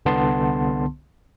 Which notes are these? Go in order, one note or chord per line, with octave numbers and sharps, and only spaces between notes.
C2 D3 B3 A5 C6